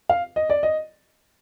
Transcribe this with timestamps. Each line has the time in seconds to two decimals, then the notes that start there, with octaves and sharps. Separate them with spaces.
0.09 F5
0.36 D#5
0.50 D5
0.63 D#5